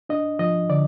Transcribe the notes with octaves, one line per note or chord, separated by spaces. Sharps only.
D4 D#5
F3 D#5
D3 D5